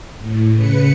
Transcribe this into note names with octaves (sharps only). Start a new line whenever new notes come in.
A2
C#3 B4 C#7